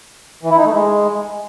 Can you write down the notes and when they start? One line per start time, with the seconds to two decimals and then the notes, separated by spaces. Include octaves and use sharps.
0.43 E3
0.51 E4
0.58 D#4
0.65 A3
0.73 G#3